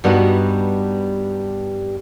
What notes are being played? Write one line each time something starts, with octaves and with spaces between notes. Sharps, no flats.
G2 G3 B3 D#4 F#4